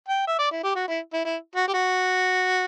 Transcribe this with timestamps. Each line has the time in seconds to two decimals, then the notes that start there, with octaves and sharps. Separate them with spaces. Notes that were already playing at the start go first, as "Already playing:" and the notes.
0.09 G5
0.27 E5
0.39 D5
0.51 E4
0.63 G4
0.75 F#4
0.88 E4
1.13 E4
1.25 E4
1.56 F#4
1.68 G4
1.74 F#4